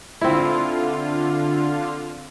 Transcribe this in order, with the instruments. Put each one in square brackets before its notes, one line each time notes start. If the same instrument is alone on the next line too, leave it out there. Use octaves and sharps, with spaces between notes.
[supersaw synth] D3 F4 [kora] C4 E4